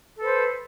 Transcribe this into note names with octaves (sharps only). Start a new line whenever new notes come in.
A4 B4 C5